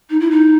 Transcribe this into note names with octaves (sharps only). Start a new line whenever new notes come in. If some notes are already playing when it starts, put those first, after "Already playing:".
D#4
E4
D#4